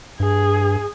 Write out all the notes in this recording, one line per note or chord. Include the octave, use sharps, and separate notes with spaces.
G2 G#4